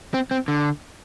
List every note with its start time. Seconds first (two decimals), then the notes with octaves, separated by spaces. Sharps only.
0.14 C4
0.31 C4
0.48 D3